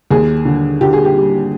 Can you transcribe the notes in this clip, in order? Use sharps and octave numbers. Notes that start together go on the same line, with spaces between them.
D#2 G#4
D3
D3 G4
G#4
G4
G3